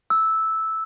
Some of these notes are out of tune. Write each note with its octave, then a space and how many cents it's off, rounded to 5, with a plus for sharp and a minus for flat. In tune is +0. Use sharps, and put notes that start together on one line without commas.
E6 -10